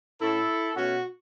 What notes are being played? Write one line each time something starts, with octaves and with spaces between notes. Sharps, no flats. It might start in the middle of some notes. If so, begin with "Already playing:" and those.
A2 A3 C#4 E4 A4
B2 A3 C#4 F#4